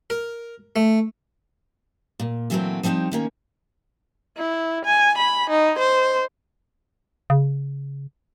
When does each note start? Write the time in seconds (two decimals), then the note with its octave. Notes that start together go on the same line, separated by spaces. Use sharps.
0.10 A#4
0.76 A3
2.20 A#2
2.50 A#2 E3 F#3 A3 B3 C4
2.83 F3 G3 C4 D4 D#4
3.11 D#3 A#3 C#4
4.38 E4
4.85 G#5
5.18 B5
5.50 D#4
5.79 C5
7.30 C#3